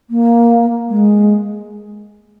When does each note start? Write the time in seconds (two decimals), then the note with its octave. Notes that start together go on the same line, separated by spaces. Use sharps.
0.10 A#3
0.90 G#3